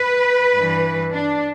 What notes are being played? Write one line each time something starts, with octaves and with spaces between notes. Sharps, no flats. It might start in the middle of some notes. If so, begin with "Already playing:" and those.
Already playing: B4
G2 E3
D4